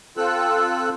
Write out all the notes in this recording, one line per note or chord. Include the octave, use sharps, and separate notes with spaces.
C4 F4 A4 E6 F#6